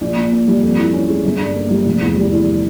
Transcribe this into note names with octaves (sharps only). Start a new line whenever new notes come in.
A#1
A#2
A#3
G3
F2
E3
C#4
G#3
G1
G2
A#3
G3
F1
E2
G3
E3